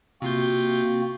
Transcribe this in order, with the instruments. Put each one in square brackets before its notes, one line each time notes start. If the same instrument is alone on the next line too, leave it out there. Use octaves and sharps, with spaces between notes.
[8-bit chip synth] C3 F4 G6 [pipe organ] A#3 C4 F#4